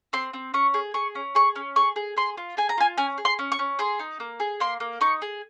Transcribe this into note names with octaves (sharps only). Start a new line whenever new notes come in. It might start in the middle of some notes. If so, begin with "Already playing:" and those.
C4 C6
C4
C#4 C#6
G#4
G#4 C#6
C#4
G#4 C#6
C#4
G#4 C#6
G#4
G#4 C6
F4
G#4 G#5
A#5
F4 G#5
C#4 G#5
G#4
C6
C#4
C#6
C#4
G#4 C6
D#4
A#3
G#4
A#3 C6
A#3
D#4 C#6
G#4